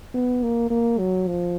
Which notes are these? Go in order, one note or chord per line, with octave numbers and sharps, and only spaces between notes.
B3
A#3
A#3
F#3
F3